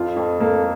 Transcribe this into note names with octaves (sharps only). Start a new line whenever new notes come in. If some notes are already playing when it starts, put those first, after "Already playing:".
Already playing: F2 F4
F2
A#3 A4